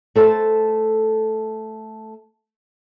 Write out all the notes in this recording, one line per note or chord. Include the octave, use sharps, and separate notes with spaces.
A3 A4 C5 A5